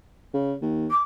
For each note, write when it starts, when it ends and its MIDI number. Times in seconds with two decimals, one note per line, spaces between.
0.34 0.55 49
0.62 0.88 39
0.90 1.02 86